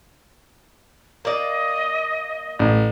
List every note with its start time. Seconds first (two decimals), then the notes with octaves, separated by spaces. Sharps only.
1.25 A#3 D5 D#5
2.59 A1